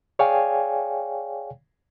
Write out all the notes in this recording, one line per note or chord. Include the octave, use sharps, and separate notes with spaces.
G#4 C#5 D5 F5 G5 G#5